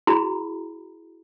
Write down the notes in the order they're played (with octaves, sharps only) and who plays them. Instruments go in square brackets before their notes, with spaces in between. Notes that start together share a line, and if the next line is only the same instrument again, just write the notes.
[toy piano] E4 F#4 G#4 A#5 B5